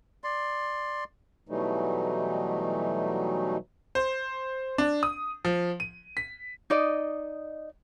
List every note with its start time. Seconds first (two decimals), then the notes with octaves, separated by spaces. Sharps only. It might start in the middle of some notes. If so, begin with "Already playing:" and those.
0.24 D5 C6
1.49 B2 E3 F#3 G3 A3 D#4
3.95 C5
4.78 D4
5.03 D#6
5.45 F3
5.80 D#7
6.17 B6
6.70 D#4 D5 D#5